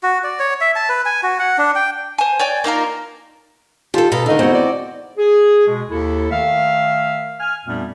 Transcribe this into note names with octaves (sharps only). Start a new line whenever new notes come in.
F#4
D5
C#5
E5
A5
B4
G#5
F#4
F#5
D4
G5
C5 G#5
C#5 D5 G5 G#5
A#3 D#4 F4 A#4
D#3 F4 G4 A4 A5
B2 A4 F5 A#5
D3 D#3 D#4 F5
E2 C4 F#4
D5
G#4
B2 G#3
D#2 E4 A4
D#3 A3 E5 F5
G#5 F6
F2 A#2 G3 A3 B3 D4